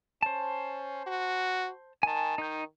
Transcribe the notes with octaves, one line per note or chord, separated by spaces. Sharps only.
C#4 C5 A5
F#4
D#3 G#5 A5
D#3 D#4 G6